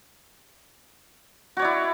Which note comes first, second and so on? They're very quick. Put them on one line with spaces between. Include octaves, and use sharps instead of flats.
F#4 C#5 D5 E4